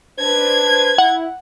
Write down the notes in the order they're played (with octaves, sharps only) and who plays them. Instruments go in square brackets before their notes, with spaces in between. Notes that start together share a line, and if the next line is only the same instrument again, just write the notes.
[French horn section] D4 B4 C5 [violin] G#6
[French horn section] E4 [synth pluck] F#5